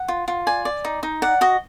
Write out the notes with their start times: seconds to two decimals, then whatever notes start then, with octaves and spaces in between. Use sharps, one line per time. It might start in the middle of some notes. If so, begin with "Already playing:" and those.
Already playing: F#5
0.08 F4
0.28 F4
0.47 D5 G#5
0.65 D5
0.85 D#4
1.03 D#4
1.22 D5 F#5
1.41 F#4 D#5